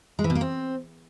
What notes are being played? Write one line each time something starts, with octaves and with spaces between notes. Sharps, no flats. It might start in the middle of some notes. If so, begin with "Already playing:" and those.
G#3
E3
B2
A#3
C4